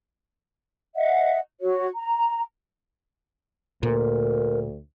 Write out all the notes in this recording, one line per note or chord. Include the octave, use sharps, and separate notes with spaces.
D#5 E5 F#5
F#4 C#5
A#5
D2 A#2 A#4